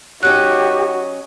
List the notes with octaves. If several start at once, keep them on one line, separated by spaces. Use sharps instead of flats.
F#3 C#4 D#4 F#4 G4 F#6